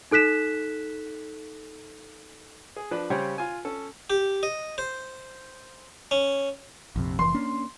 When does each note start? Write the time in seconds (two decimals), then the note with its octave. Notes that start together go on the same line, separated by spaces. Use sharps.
0.11 D#4 A4 F#6 B6 E7
2.76 G#4
2.91 F3 D4 B4
3.10 C#3 G3 G4 C5 C#5
3.38 F4 G#5
3.65 C#4 A4
4.10 G4
4.43 D#5
4.78 C5
6.11 C#4
6.96 A#1 F2 C3
7.19 F1 E3 C6
7.35 A#3 C#4 D4